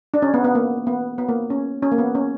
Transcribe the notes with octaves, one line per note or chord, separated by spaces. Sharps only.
D4
C#4
B3
B3
A#3
B3
B3
A#3
C#4
C#4
A#3
B3
C#4